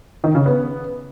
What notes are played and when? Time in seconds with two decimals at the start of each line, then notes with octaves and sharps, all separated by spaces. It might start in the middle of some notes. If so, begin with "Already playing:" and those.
0.24 D#3
0.35 C#3
0.46 B3